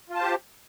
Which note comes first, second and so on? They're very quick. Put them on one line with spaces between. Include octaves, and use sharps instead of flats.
F4 A5 C5 G4